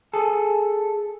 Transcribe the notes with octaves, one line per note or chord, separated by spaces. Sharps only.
G#4 A4